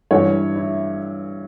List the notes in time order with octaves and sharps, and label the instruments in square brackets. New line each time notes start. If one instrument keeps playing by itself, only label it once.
[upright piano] G2 E3 C#5
E4